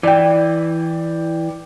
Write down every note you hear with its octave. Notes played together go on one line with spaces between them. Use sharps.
E3 D5 G5